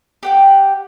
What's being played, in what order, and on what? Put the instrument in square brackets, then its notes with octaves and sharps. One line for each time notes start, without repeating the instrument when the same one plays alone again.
[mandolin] G4 F#5 G5